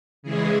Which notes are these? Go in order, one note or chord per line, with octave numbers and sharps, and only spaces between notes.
C#3 E3 G#3 G#4